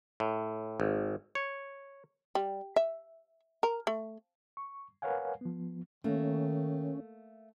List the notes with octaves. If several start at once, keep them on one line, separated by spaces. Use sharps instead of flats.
A2
G#1
C#5
G3
E5
A#4
A3
C#6
A#4 B4 C#5 F5 F#5 G#5
F3 B3
D#3 A3 A#3 C#4